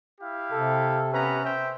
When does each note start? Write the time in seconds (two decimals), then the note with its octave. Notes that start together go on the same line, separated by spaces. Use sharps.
0.20 E4 G4 F5
0.52 C3 A4
1.12 B3 C#4 B4 A#5
1.43 C5 E5 G5